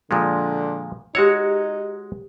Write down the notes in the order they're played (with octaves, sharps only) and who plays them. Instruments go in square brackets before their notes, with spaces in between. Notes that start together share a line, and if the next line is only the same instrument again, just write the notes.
[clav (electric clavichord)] A#2 F3 G#3 [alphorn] D3
[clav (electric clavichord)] G#3 F#4 C#5 [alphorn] D#4 [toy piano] G4 E6